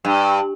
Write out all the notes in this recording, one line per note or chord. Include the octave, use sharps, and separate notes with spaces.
G2